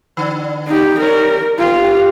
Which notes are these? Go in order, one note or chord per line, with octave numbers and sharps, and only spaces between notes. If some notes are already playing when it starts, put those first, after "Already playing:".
D3
D#4 G4
G3 A#4 B4 C#5
B3 F4 G4